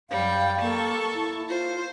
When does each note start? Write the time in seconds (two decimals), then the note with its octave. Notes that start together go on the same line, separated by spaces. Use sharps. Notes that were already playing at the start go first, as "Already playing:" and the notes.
0.10 F#2 G3 F5 G5
0.61 A#3 A4 A5 C#6
1.15 E4
1.49 F4 C5